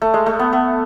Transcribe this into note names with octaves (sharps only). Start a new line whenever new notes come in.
A3
G#3
A3
B3
B3